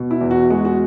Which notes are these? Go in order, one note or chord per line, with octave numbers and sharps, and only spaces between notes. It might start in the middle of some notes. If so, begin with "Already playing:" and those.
Already playing: B2
E4
E2
F#4
G#3 F#4
F#4